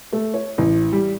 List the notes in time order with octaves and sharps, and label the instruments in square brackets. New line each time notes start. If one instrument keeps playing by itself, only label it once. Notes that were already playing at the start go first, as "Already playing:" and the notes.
[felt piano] A3
C#5
A1
G3